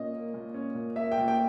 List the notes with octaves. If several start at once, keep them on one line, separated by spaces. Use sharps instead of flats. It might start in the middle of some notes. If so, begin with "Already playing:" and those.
Already playing: A#2 C#4 D#5
A#3
A#2
C#4
A#2
A#3 E5
G5
A#2
G5